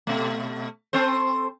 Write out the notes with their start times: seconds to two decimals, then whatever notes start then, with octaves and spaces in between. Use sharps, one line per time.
0.07 B2 A3
0.93 C4 A4 C5